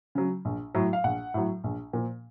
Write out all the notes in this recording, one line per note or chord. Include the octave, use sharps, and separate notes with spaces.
C#3 F#3
A#1
A2 F#3
F5
A#1 F#5
A2 F#3
A#1
A#2 F3